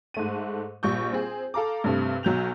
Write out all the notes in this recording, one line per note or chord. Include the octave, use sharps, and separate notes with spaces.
G#2 A3 D#7
A#1 G3 C#6 G6
C4 G#4
A4 F5 A#5 D6
G2 C3 A3
B1 F#3 G6 F7